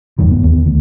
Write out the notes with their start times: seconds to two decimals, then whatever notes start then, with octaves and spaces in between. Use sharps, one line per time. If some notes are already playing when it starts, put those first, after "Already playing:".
0.19 F#1 E2 G2 D#3
0.31 B3
0.43 D#2 D#3 B3
0.66 D2